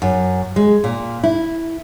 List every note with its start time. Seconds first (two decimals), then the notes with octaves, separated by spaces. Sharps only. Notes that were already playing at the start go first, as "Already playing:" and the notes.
0.02 F#2
0.56 G#3
0.84 A#2
1.23 E4